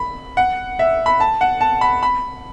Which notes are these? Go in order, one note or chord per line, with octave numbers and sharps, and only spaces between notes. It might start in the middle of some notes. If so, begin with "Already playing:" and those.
Already playing: B5
F#5
E5
B5
A5
F#5
A5
B5
B5